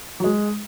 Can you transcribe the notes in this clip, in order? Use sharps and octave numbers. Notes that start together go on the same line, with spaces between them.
F#3
G#3